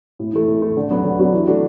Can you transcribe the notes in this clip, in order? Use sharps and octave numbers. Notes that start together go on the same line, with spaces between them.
A2
E3 A3
A2
E3 A3
D3
F#3 B3 D4 F#4
D3
F#3 B3 D4 F#4
E3
A3 D4 F#4